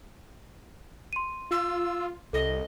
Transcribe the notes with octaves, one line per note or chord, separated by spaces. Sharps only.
C6 D#7
F4 E6
C2 A4 D#5 A#6